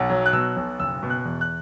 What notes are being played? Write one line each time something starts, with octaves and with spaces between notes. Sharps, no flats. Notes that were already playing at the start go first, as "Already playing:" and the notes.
Already playing: B1 F#5
F#3
F#6
B2 E6
B1
F#1 E6
B2
F#6
E2
F#6